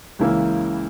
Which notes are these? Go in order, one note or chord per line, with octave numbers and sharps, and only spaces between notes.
C#2 C#3 E3 A#3 E4